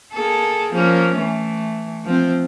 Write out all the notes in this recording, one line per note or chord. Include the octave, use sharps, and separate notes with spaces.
A#3 G#4 A4
F3 A#3 C#4
E3 A3
F3 C4